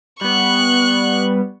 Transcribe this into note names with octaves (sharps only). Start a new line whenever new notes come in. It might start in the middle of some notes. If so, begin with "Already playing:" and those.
G3 B3 C#6 F#6